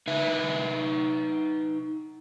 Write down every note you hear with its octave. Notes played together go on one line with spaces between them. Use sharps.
D#4 B4 E5